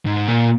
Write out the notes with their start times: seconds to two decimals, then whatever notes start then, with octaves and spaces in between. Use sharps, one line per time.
0.06 G#2
0.28 A#2